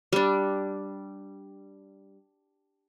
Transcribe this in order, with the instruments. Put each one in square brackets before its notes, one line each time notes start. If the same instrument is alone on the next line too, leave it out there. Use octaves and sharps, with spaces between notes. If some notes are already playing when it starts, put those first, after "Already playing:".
[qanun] G3 D4